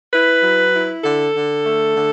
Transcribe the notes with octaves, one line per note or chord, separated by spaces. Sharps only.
E4 B4
F#3
E4
D3 A4
D3
A3
D3